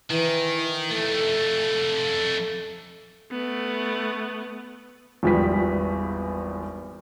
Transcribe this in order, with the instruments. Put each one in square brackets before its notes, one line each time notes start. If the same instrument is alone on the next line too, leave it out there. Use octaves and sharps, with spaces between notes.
[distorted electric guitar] D#3 [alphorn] E3
[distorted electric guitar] F2 A3 [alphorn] A4
[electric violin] A3 B3
[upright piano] G#1 E2 F3 G3 B6